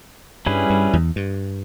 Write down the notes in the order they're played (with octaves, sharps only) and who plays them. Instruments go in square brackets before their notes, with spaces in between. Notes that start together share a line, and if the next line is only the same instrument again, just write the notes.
[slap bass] G2 [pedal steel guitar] G3 C#4 E4 G#4 B4
[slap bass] G2
E2
G2